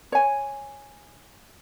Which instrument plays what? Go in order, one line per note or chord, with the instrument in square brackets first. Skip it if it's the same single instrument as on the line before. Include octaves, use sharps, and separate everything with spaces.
[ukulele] C#5 G#5